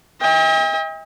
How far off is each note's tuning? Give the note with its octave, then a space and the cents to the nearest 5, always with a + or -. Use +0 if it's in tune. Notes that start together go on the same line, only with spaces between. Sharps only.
D#5 +45 G5 +45